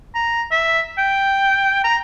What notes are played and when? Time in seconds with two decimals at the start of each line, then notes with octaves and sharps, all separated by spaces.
0.15 A#5
0.51 E5
0.98 G5
1.84 A#5